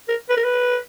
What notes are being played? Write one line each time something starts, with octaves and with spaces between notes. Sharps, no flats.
A#4
B4
A#4
B4